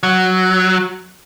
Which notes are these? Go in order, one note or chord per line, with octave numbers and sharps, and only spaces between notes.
F#3